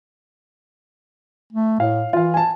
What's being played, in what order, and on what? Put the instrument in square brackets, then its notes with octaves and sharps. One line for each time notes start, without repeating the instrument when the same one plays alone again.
[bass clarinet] A3
[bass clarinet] A2 [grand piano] F5
[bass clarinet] E3 [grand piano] F4 F5
[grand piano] G#5 A5